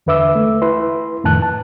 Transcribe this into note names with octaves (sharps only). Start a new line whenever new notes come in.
E2 D3 B4 E5 D6 E6
A3
E4 B4 C6
F2 A2 D#3 A5 F#6
A5